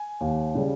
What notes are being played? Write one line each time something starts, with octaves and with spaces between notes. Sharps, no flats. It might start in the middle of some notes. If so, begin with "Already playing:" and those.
Already playing: G#5
D#2
C#3 G3